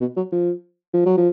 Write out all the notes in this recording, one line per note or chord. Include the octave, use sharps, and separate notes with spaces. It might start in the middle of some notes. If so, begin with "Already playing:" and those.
B2
F#3
F3
F3
F#3
F3